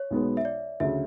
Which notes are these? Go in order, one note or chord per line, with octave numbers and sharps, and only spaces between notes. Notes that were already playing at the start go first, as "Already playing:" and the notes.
Already playing: C#5
B1 B2 G#3 B3 F#4
E5
D5
D2 C#3 F#3 E5